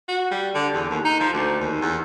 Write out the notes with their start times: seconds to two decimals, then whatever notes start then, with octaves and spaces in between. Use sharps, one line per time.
0.08 F#4
0.31 G3
0.55 D3
0.74 E2
0.90 D#2
1.05 D#4
1.20 F3
1.33 D2
1.60 D#2
1.81 E2